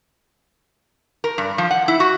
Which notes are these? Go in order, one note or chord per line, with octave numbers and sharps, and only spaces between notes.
A#4
G2
F3
F#5
E4
F#4